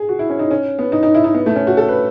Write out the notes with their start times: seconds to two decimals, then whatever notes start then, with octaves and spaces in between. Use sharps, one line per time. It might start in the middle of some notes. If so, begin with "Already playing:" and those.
Already playing: G#4
0.09 F#4
0.19 E4
0.30 C#4
0.39 D#4
0.51 C#4
0.79 B3
0.92 D#4
1.03 D#4
1.14 E4
1.24 D#4
1.34 B3
1.46 A3
1.56 C#4
1.67 F#4
1.77 A4
1.89 B4